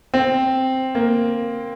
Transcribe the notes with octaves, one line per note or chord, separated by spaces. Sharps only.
C4
A#3